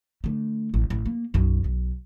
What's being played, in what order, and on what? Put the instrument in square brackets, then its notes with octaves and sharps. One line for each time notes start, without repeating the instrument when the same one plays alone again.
[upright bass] D3 A3
A1
A1
A#3
B1 F#2
B1